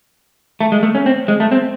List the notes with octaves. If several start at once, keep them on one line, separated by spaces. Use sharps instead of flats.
A3
G#3
A3
C#4
C4
G#3
A3
C4